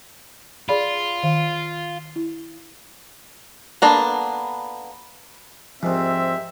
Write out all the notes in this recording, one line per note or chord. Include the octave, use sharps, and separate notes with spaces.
F4 G#4 D5 B5
D#3 F5
E4
A#3 B3 D4 A4 B4
C2 G#2 F3 C4 E5